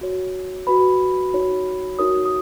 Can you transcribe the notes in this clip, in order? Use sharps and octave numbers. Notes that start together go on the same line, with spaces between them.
F#4 C#5
F#4 B4 B5
D#4 F#4 C#5
D#4 F#4 A#4 C#5 D#6
D#6